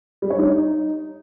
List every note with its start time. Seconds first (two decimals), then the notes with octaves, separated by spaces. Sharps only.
0.22 G3
0.30 C#5
0.39 D#4